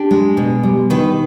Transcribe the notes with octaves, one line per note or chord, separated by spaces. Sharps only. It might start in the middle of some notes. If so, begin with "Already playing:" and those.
Already playing: D4 G4
G#3
B2
G3
D#3 B4